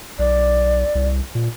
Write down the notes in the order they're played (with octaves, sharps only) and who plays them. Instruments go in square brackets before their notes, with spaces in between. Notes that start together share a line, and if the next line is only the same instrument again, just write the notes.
[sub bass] B1 [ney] D5
[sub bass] C2
A#2